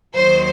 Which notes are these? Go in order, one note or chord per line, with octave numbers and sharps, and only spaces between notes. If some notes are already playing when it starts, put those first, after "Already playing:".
D#2 D#3 F#3 C5